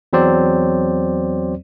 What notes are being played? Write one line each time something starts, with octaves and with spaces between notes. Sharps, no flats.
E2 F#3 C4 C5 D5